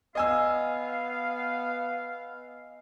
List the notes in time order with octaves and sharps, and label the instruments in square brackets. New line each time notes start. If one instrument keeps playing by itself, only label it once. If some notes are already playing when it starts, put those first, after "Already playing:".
[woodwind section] B3 F5 [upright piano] D#5 G#5 E6